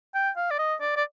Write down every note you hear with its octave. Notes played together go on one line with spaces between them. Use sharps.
G5
F5
D5
D#5
D5
D5